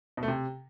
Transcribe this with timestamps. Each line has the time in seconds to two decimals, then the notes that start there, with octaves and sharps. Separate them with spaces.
0.17 B2
0.23 A3
0.28 C3